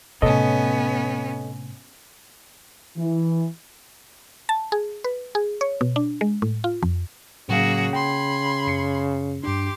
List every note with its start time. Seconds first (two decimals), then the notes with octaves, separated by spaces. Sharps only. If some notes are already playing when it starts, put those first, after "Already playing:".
0.22 A2 C3 B3 C#4 A4 C#5 D#5
2.97 E3
4.49 A5
4.72 G#4
5.04 B4
5.35 G#4
5.61 C#5
5.81 B2
5.96 D4
6.21 G#3
6.42 A2
6.64 F4
6.83 F2
7.49 A2 C#3 F#3 A#3 F#4 G#4 F5
7.93 G5 B5 C6 G#6
8.67 F#2 C7 C#7
9.44 G2 D4 G4 C6 D6